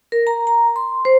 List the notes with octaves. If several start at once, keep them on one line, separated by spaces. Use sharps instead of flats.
A#4
A#5
A#5
C6
C5